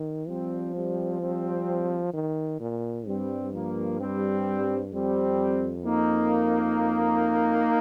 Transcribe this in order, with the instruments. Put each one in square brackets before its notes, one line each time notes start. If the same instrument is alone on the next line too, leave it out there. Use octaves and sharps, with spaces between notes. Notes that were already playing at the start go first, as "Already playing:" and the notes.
Already playing: [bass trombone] D#3
[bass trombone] F3 [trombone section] G3 C4
[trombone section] G3 C4
G3 C4
[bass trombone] D#3
A#2
[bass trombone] G2 [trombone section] G3 C4
[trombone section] F3 A#3
G3 C4
[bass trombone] F2 [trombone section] G3 C4
[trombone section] A#3 D#4